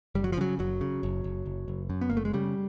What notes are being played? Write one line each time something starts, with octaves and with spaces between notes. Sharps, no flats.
F#1 G3
F#3
F3
C#3 F#3
F#1 F#3
C#3
F#1
F#1
F#1
F#1
F#2
B3
F#1 A#3
A3
G#3
C#3 G3